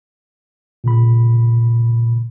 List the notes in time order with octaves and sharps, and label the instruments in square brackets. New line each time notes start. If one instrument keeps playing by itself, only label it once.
[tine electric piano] A#2 C#3 B5